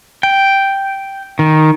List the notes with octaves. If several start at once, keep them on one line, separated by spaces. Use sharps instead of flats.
G5
D#3